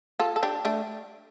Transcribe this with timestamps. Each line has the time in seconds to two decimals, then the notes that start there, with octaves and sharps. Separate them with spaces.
0.19 F4 A4
0.36 A4
0.43 D4 G4
0.65 A3 D4